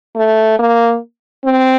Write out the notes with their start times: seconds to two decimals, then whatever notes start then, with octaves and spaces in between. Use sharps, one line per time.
0.16 A3
0.59 A#3
1.45 C4